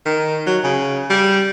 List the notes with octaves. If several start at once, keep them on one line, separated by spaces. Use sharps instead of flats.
D#3
F#3
C#3
G3